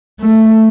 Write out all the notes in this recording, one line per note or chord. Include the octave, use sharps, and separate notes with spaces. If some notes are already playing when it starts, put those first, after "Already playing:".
A3